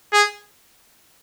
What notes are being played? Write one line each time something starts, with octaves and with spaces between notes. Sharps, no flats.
G#4